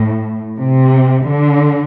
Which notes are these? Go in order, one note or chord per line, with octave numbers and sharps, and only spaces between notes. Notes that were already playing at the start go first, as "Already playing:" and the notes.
Already playing: A2
C3
D3